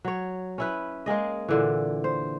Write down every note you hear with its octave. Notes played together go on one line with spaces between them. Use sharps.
F#3 C#5
C#4 E4 B4
G#3 A#3 G#4 D#5
A#2 D3 E3
C5